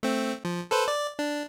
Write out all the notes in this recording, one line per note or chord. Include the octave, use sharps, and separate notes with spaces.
A3 C4
F3
A4 B4 C5
D5
D4